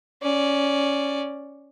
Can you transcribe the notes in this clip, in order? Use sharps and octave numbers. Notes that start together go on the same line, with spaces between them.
C#4 D5